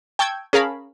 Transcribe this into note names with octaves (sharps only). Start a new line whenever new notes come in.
G5 A5 C#6 E6 G6 G#6
C#4 G#4 A#4 F5 A5 B5